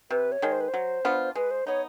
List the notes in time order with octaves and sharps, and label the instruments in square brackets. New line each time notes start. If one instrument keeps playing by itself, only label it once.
[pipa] C3 [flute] B4
[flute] C#5
[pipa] D#3 G#3
[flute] C5
B4
C5
[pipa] F#3
B3 D4 F4
[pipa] G#3 [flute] B4
[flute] C5
[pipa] B3 D#4 [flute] C#5